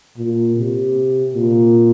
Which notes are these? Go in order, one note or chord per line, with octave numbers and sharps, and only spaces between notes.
A#2
C3
A#2